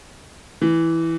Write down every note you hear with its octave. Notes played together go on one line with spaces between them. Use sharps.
E3